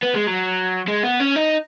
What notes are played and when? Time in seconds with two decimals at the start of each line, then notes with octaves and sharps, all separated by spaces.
0.03 B3
0.15 G#3
0.27 F#3
0.88 G#3
1.04 B3
1.20 C#4
1.36 D#4